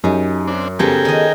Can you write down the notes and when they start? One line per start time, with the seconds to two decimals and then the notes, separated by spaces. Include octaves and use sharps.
0.04 F#2 D#4 G4 G#4
0.47 C4 D4
0.79 C#3 F3 B3 G4 A4 A#4 G5 G#5
1.05 D#3 D#5